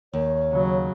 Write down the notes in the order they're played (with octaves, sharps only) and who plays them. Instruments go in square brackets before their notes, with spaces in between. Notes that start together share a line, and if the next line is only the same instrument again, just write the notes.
[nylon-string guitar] D#2 [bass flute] C#5
[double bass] C#3 F#3